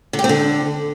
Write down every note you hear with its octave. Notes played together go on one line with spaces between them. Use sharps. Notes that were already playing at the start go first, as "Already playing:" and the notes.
D3
G4
C4
D3